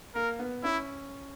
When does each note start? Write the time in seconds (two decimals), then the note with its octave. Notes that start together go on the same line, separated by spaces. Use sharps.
0.15 A#3 A#4
0.39 B3
0.63 C#4 E4